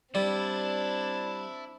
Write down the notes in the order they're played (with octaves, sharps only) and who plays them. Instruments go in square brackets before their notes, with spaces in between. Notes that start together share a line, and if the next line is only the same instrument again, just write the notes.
[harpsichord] G3 [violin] C4 D4 [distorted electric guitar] E4 [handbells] D5